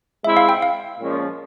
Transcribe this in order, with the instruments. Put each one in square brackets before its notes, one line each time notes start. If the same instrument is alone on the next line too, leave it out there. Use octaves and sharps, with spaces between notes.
[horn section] G#3 C4 E4 [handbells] E5
[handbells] F5
G5
F5
[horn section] A#2 F3 G#3 C#4